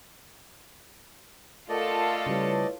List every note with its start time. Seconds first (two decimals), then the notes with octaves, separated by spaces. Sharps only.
1.69 A3 F4 A4 A#4 D5 D#5 F#5
2.26 C#3 G3 E4 B4 C#5